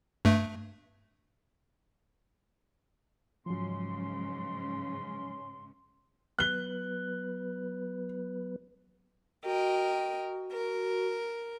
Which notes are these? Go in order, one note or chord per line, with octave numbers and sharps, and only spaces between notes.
G2 A3
G#2 C#3 F3 F#3 C#4 C6
F#3 B3 B4 F#6 G7
F#4 A#4 D#5 G5
A#4